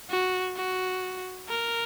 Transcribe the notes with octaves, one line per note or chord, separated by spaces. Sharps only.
F#4
F#4
A#4